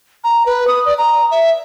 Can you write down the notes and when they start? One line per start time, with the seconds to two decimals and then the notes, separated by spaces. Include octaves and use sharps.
0.24 A#5
0.46 B4
0.67 D#6
0.85 D5
0.98 A#5
1.31 E5